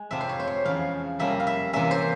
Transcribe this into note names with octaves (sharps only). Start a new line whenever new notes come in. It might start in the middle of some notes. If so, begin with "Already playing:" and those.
Already playing: G#3
F2 C3 F3 C4 E5
C5
C#5
C5
C#5
E2 C#3 F3 F5
F2 C3 G3 A#3 C#4 E5
F5
E5
C3 E3 A#3 C#4 E5
C5